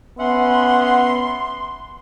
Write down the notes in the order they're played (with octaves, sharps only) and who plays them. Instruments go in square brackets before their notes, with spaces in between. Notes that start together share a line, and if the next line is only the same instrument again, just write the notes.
[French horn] B3 [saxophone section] C#4 E5 F#5 [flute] C6